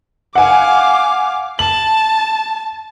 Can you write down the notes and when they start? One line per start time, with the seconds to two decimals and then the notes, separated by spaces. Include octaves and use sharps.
0.35 F5 F#5 G#5 D6
1.59 A5 F#7